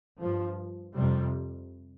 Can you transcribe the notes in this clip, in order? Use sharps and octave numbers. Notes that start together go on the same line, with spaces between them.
G2 F3
F2 C3 G3